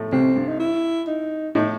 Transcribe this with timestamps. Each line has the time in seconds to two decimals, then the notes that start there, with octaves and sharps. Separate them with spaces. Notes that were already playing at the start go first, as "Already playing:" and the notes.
Already playing: A2 A3
0.12 C2 C3 C4
0.36 G2
0.48 D#4
0.60 E4
1.08 D#4
1.55 A2 D#4